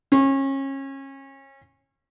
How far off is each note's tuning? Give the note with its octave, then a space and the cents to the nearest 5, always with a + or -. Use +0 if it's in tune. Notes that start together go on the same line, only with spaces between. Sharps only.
C#4 -30